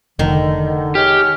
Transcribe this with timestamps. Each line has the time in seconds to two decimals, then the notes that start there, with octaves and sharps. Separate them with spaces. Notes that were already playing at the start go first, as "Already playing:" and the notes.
0.19 F1 D3 D#3
0.95 G#3 G4 C#5 F6